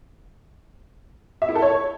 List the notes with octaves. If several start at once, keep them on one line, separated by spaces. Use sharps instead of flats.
E5
E4
A4
C#5